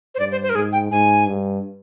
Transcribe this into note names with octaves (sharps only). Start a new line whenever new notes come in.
C5
G2 D5
C5
C5
A#4
G#2 G#4
G5
G#2 G#5
G2